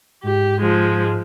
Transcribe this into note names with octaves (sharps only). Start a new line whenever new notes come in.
G#2 G4
F3 G#3